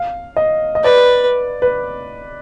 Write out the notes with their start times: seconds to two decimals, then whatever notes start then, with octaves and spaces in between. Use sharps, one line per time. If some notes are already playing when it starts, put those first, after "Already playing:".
Already playing: F5
0.37 D#5
0.75 D#5
0.84 B4 D5
1.62 B4